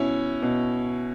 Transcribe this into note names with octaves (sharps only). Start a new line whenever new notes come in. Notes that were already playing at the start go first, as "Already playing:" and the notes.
Already playing: B2 C#4 E4
B2